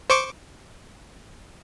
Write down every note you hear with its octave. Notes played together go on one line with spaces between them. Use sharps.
C5 C#6 D6